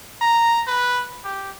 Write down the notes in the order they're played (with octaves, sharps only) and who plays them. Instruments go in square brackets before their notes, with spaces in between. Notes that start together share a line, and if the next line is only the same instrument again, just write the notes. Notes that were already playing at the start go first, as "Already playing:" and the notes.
[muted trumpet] A#5
B4
G4